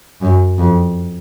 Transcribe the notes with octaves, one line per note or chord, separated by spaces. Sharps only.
F#2
F2